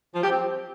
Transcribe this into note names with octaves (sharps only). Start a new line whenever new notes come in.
F3
G4
C4